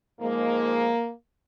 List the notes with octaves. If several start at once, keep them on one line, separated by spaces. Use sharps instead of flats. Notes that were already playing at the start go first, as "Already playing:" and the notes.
G#2 F3 G#3 A#3